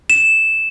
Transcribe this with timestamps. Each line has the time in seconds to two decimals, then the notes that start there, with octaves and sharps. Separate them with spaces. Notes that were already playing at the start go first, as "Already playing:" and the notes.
0.10 E7